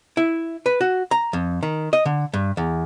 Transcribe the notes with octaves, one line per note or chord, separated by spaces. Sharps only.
E4
B4
F#4
A#5
F2
D#3
D#5
D3
G2
E2